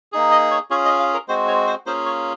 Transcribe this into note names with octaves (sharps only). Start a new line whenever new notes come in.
A#3 D#4 G#4
D#5
C#5
C#4 F4 G#4 C#5
D#5
F5
A#4
G#3 C4 F#4 C5
C#5
C5
A#3 C#4 F4 G#4 C5
C#5